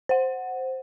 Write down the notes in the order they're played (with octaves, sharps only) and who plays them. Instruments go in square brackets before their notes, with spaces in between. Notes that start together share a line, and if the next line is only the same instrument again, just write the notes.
[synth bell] C5 F#5